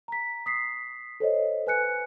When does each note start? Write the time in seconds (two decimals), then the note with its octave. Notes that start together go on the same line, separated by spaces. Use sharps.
0.08 A#5 B6
0.46 D#6 B6 C7
1.20 A4 C5 C#5 D#5
1.67 B4 G#5 F#6 C#7